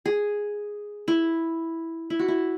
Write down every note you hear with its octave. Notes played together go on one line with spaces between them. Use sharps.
G#4
E4
E4
F#4
E4